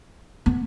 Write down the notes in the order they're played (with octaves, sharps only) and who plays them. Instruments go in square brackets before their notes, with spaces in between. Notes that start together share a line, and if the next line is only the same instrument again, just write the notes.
[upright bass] B3